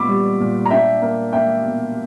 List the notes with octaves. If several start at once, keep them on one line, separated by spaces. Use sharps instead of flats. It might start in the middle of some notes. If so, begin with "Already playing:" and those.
Already playing: A#2 B3 B5 C#6 D6 E6
G3
A#2
A#5
D4 E5 G5
A#3
A#3 E5 G5
B2